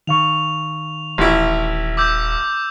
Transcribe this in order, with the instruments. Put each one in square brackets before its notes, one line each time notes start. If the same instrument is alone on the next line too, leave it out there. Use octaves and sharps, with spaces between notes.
[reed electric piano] D#3 F5 C#6 [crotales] F7
[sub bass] D#1 [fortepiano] A1 E4
[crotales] D6 E6 G6